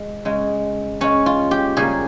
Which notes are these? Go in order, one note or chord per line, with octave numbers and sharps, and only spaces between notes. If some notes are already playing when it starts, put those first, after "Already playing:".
Already playing: G#3
C#3 G#3
C#3 G#3 C#4
F4
G4
C#3 G3 A#3 G#4